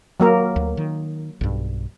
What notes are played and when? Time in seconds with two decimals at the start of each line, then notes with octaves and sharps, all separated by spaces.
0.20 F#3 A#3 A#4
0.56 D2
0.77 D#3
1.41 B1 G2